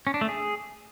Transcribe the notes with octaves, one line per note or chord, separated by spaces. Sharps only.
C#4
D4
A3
G#4